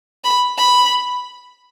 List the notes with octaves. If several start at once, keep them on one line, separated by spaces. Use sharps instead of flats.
B5
B5